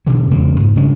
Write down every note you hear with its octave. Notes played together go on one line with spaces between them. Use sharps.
B2 D3 E3
E2 C#3 G#3 A#3
G#2
C#3 G3 G#3 D4